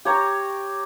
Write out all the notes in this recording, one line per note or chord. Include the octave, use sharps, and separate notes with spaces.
G4 C#5 A#5